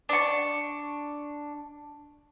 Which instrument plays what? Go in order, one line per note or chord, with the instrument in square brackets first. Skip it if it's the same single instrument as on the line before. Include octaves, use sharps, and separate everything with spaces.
[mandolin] D4 C#6